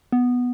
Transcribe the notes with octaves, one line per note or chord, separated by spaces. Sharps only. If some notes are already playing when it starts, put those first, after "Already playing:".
B3